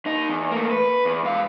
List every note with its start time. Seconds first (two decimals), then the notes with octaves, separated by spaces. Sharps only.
0.06 D#2 D#4
0.29 E2
0.51 A3 A#3
0.71 B4
1.05 E2
1.24 G#2 F5